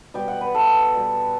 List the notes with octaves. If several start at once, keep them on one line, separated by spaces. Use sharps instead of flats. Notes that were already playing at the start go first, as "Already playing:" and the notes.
B2 G3 G5
F#5
B4
A4
B2 G3